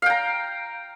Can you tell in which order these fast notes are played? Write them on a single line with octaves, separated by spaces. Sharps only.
F5 G5 A#5